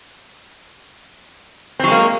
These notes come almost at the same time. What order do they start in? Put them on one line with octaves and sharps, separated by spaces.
C4 F#3 G#3 A#3